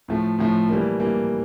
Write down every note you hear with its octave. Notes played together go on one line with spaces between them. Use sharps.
A2 F3 A3
A2 F3 A3
E3 G3 A#3
E3 G3 A#3